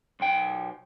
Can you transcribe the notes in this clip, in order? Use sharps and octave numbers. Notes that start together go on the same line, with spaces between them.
B1 G5